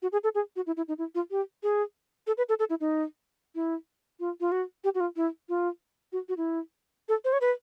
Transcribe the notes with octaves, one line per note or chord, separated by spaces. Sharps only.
F#4
G#4
A4
G#4
F#4
E4
E4
D#4
E4
F4
G4
G#4
A4
B4
A4
A4
E4
D#4
E4
F4
F4
F#4
G4
F#4
F4
E4
F4
F#4
F#4
E4
A4
C5
C#5
B4